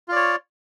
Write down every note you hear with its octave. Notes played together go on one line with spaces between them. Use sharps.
F4 C#5 D5